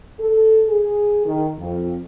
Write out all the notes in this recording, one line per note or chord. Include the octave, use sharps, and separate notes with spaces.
A4
G#4
D#3
F2